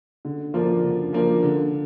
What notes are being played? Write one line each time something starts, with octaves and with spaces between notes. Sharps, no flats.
D3
F3 A#3 D4 F4
D3
F3 A#3 D4 F4
D3